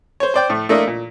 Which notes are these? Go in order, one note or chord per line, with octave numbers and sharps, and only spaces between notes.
C5 C#5
C5 D5 G5
A2 A3
A3 A#3 D4 E4 D#5
A#2